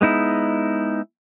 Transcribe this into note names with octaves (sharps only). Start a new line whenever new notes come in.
G#3 B3 D#4 E4